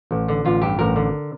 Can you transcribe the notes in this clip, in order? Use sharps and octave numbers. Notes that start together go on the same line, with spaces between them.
A1
D3
A1 F4
G2 G4
A1 A#4
D3